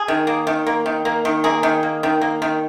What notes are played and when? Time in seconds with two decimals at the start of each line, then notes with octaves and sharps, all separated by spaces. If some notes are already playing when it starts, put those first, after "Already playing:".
Already playing: G#4
0.08 D#3
0.27 A#3
0.47 D#3
0.67 A#3
0.86 D#3
1.05 A#3
1.25 D#3
1.44 A#3 G#4
1.63 D#3
1.83 A#3
2.03 D#3
2.22 A#3
2.42 D#3